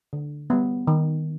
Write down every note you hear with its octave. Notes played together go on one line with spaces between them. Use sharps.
D3
G3 B3
D#3